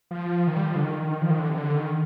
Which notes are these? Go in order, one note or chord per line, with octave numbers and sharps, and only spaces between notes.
F3
D#3
G3
F3
D3
D#3
F3
D#3
D3
C3
D3
D#3